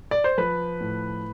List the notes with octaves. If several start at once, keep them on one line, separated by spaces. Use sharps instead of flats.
D5
C5
F3 B4
A2